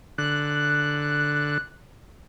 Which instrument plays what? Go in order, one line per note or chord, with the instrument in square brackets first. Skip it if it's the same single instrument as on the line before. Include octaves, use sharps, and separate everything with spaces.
[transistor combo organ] D3 [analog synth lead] F#6